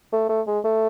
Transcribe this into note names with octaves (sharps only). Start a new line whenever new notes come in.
A3
A3
G#3
A3